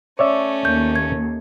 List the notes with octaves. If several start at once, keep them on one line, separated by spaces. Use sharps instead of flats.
A3 C#4 C#5 D5 E5
D#2 G6
G#6